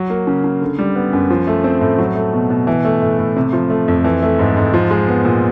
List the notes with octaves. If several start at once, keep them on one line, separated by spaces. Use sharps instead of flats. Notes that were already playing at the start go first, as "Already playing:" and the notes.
Already playing: F#3
A#3
C#3
C#3
D3
G3
B3
F#2
F3
A3
C4
A2
F#3
A3
B2
B2
E3
A3
A2
A2
C3
F3
A3
F2
E3
A3
G#2
G#2
F3
G#3
B3
A#2